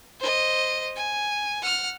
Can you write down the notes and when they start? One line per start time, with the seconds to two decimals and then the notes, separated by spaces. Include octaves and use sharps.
0.20 C5 D#5
0.96 G#5
1.62 F#5 F6